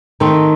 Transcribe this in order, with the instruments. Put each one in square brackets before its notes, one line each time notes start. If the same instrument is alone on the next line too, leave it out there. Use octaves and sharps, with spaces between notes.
[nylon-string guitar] D#3 [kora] A3 C4 D#4